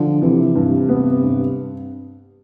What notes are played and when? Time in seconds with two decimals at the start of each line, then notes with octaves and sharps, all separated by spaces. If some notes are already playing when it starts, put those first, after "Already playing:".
Already playing: D3 F3
0.22 C3 E3
0.55 G2
0.89 B3
1.23 G2